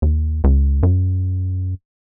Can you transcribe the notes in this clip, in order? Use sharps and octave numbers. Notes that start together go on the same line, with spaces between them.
D#2
C#2
F#2